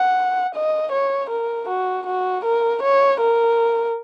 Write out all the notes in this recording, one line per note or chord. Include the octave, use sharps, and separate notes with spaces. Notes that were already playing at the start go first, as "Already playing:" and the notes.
Already playing: F#5
D#5
C#5
A#4
F#4
F#4
A#4
C#5
A#4